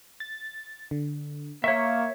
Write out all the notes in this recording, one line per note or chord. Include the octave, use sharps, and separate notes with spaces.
A6
D3
A#3 C#5 E5 C#6